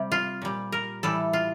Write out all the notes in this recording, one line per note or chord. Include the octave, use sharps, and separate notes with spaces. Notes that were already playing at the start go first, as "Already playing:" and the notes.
Already playing: C3 G3
F4
A#2 G3
A#4
A2 E3 G3 A4
F4